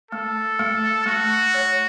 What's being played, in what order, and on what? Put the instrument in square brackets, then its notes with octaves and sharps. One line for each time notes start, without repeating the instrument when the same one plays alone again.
[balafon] A3 [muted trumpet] A4
[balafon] A3
[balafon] A3 [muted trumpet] F#4
[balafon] C#5